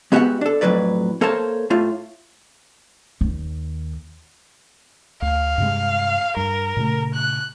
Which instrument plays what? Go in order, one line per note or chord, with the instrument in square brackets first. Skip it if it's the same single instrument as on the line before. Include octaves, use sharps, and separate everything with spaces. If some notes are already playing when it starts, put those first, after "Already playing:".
[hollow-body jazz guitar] G#3 B3 F#4 G4 E5 F#5
D4 A4
F2 A2 C3 F#3 B4 D5
A#3 A4 A#4 C5 C#5 A5
A2 A3 F4
[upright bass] D#2
[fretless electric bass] D2 [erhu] F5
[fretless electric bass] G2 C3 G#3
[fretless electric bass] G2 [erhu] A#4
[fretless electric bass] A#2 C#3 A3
[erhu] F#6